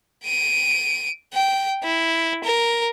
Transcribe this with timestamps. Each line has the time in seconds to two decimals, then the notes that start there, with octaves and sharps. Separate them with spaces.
0.24 D7 D#7
1.34 G5
1.83 E4
2.44 A#4